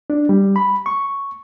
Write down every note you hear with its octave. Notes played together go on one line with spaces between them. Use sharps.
D4
G3
B5
C#6